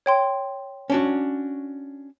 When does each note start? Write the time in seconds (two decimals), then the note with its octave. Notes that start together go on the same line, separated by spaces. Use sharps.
0.06 C#5 G5 C6
0.90 C#4 D4 F#4